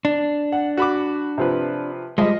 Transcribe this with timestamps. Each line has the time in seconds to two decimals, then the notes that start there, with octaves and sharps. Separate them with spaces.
0.05 D4
0.52 F#5
0.77 F#4 B5 D6
1.38 C3 F3 B4
2.18 F3 G3 G#3 D#5